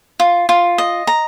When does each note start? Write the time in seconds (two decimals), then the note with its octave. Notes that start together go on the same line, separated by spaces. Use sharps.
0.20 F4
0.49 F4
0.78 D#5
1.07 A#5